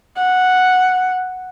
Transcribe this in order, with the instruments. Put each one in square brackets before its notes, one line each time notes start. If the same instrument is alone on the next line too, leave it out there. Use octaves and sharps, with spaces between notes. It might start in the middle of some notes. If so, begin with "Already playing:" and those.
[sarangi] F#5